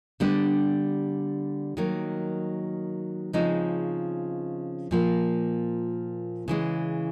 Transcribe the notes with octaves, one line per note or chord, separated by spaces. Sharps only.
D3 G3 B3 D4 G4
D#3 F#3 A#3
C#3 F3 G#3 C4 D#4
A#2 F3 A#3
C#3 E3 G#3